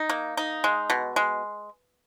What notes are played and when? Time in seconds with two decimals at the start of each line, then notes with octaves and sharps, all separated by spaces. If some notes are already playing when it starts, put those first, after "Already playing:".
Already playing: D#4
0.10 A#3
0.37 D#4
0.64 G#3
0.90 B2
1.16 G#3